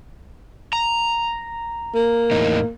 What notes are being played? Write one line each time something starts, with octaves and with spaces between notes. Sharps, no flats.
A#5
A#3
E2 A2 D#4